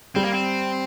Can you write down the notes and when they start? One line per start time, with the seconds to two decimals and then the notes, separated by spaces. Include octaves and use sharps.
0.15 G3 C4
0.24 A#3
0.32 C4